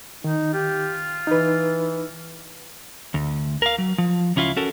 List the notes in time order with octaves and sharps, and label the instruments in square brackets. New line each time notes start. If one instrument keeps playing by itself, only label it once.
[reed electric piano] D#3 [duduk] D#4
[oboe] F4 [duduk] G4
[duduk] E3 [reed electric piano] D#4 B4
[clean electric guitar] D2
A#4 F5
F#3
F3
C#2 C#4 E4 F4 F5
C#4 F#4 A4 A#4